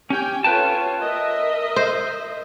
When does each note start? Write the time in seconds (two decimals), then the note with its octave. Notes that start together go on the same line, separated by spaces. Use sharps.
0.10 C#4 G4 G5 G#5
0.44 F4 A4 B4 C#5 G5 A5
0.99 A#4 D#5 E5
1.76 C5